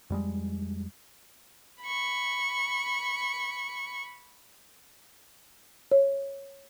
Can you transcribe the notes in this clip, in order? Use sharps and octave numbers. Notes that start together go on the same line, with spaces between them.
F2 G3 G#3
B5 C#6
C#5